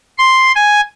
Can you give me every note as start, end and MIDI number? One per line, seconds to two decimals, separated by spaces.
0.18 0.52 84
0.55 0.81 80